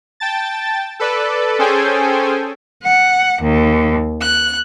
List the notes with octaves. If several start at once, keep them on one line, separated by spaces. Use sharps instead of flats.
G5 A5 A6
A4 B4 D5
C#4 G#4 A4 C5 G5 G#5
F#5
D#2
F#6